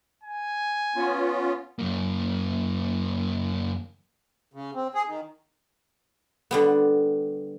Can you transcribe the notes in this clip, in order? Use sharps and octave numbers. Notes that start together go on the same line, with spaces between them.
G#5
B3 C#4 F4
F#2 A#3
C#3
C4
G#4
D#3
D3 G3 B3